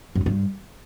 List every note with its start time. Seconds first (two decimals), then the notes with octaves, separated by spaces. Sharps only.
0.16 F#2
0.21 G#3
0.26 G2